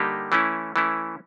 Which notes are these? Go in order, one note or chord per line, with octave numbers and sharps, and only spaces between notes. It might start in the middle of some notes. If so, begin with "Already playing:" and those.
Already playing: D3 G3 A#3 D#4 G4
E3 A3 C#4 E4
E3 A3 C#4 E4